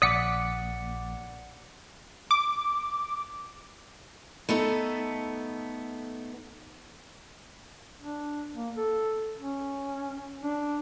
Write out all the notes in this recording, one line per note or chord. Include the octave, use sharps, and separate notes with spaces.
A#1 D5 F#5 D6 D#6 B6 C#7
D6
A3 B3 D#4 A4
D4
A#3
A4
C#4
D4